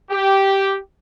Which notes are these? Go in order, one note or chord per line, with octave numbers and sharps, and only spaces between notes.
G4